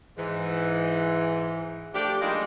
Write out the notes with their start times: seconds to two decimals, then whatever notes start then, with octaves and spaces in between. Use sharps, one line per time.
0.17 G#2 E3
1.94 F3 A3 D4 G4
2.21 G3 G#3 A#3 D4 D#4 F4